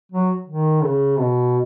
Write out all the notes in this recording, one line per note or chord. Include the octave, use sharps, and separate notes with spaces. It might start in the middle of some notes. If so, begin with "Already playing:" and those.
F#3
D#3
C#3
B2